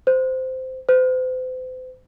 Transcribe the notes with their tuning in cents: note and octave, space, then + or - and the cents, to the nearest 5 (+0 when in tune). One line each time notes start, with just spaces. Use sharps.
C5 -15
C5 -40